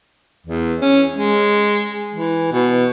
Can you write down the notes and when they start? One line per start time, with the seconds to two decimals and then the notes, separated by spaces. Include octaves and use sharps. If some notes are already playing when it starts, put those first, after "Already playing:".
0.46 E2
0.81 C#4
1.15 G#3
2.15 E3
2.52 B2